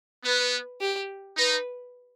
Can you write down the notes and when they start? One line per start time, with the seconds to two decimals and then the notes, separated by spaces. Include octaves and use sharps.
0.24 B3 B4
0.81 G4
1.37 D#4 B4